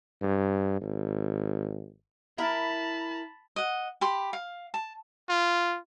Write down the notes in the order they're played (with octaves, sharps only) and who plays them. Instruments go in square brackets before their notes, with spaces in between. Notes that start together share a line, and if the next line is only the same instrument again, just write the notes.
[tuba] G2
G#1
[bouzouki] E4 A#4 [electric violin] A5 B5
[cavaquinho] D#5 F#5
G4 B5 C6
F5
A5
[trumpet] F4